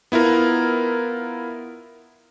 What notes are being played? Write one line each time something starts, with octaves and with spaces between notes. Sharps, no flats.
B3 E4 F4 A#4